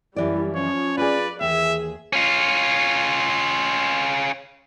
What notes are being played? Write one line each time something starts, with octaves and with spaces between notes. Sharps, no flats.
F#2 E3 G3 E4 D5
F3 C#4 C#5
F4 G#4 B4 D5
D#2 E3 G#4 E5
C#4 F4